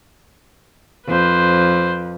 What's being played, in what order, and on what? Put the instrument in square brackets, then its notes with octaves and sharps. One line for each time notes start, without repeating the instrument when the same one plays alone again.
[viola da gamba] F2 [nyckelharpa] B4 C5